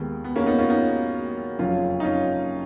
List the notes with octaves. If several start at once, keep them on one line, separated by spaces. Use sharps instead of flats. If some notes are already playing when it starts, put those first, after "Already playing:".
Already playing: D#2 D#3 G#3 B3
B3
A#3 C#4
B3 D#4
C#4 F4
B3 D#4
F#1 F2 F3 C#4 F4
D#4
C#4 F4